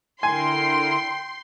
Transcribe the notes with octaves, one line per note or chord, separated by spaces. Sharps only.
D3 E4 A#4 G5 G#5 C6